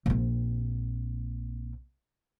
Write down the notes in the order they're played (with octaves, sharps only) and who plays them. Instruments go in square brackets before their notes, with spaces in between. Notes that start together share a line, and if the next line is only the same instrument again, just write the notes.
[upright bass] A#1 C4